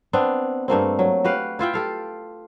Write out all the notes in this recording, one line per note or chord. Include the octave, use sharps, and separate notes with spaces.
B3 C4 D4
G2 A3 A#3 C4
F#3
F#4 G4 B4 F5
E4 F4 E5 G5
G4 A4 F5